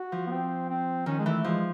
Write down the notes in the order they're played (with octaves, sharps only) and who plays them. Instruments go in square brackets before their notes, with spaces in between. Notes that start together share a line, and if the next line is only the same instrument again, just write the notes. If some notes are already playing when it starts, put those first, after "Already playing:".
Already playing: [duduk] F#4
[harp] F3
[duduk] B3
C4
C4
[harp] D#3 [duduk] C#4
[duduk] G#3
[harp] E3 [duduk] A3
[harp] F3 [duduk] G#3